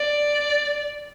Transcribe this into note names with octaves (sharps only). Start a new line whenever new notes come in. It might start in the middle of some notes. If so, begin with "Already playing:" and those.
Already playing: D5